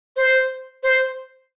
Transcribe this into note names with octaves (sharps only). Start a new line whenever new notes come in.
C5
C5